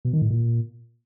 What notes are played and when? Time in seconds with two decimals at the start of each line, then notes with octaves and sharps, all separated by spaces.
0.05 B2
0.13 D#3
0.22 A2
0.30 A#2